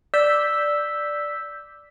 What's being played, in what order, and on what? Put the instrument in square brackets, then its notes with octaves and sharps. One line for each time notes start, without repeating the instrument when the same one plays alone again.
[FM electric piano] D5 E6 G6 B6